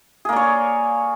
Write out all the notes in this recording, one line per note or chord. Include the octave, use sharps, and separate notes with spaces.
A#3 G#4 C#5 D5